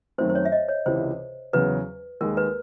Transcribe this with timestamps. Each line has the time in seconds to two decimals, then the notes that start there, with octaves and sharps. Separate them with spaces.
0.18 F#2 D#3 F#3 A3 C4 C5
0.30 C5
0.35 C#5
0.45 E5
0.52 D#5
0.69 C#5
0.86 C#2 C3 E3 C5
1.53 E2 C#3 F#3 B4
2.21 D#2 D#3 G#3 A#4
2.37 B4